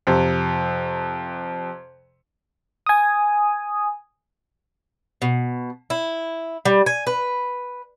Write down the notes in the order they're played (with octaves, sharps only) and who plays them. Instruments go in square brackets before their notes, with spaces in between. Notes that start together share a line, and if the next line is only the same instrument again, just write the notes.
[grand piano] F2 C3
[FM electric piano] G#5 D#6
[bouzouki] B2
E4
G3
G#5
B4